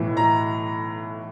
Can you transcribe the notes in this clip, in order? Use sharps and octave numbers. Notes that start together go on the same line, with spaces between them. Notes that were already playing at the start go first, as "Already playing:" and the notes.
Already playing: B1 A2 E3
A#5